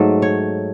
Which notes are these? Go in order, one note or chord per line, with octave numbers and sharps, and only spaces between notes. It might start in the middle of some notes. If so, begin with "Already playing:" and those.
Already playing: G#2 F#3 A3 A4
C#5